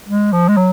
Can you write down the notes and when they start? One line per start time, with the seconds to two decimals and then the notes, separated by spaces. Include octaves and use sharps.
0.09 G#3
0.33 F3
0.49 G#3
0.57 F#3